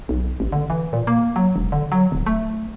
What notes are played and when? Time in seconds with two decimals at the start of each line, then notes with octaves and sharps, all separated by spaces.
0.09 B1
0.40 A1
0.52 D3
0.70 E3
0.93 A#2
1.07 A#3
1.36 F#3
1.56 E1
1.72 D3
1.92 F#3
2.12 D1
2.26 A3